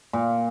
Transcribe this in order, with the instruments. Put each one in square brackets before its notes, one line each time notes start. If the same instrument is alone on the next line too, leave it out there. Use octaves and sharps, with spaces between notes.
[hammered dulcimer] A#2